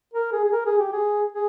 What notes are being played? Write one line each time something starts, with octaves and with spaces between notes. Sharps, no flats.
A#4
G#4
G#4
A#4
G#4
G4
G#4
G#4